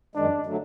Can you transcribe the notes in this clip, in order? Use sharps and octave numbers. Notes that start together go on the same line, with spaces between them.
F#2 D#3 G#3 D4
D3 F#3 A3